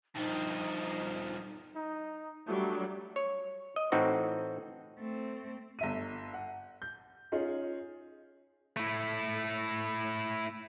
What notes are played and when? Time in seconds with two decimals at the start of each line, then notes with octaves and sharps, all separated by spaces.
0.16 G2 F3 D#4
1.76 D#4
2.48 F#3 G3 A3 D4
3.16 C#5
3.76 D#5
3.92 A2 E3 C4 D#4 F#4
4.99 A3 C4
5.79 G1 E5 D#7
6.34 F#5
6.82 G6
7.32 C#4 D#4 F4 G#4 C#5
8.77 A3 E4